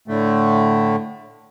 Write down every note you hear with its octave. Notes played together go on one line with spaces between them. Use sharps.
A2 D3 A3